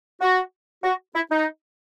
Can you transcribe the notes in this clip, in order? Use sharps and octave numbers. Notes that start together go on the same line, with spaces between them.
F#4
F#4
E4
D#4